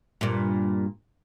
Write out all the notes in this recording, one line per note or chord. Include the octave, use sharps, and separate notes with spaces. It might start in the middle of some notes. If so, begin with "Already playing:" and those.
G2 A#2